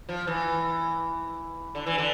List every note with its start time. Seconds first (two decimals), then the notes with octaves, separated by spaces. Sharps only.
0.09 F3
0.27 E3
1.75 D3
1.86 E3
1.98 D3